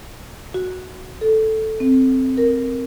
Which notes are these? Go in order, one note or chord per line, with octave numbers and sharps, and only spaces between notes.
F#4
A4
C4
A#4